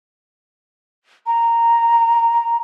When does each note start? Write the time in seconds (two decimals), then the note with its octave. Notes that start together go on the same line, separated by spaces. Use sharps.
1.27 A#5